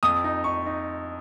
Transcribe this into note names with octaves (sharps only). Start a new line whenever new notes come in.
F2 D#6
D#4
D#4 C#6
D#4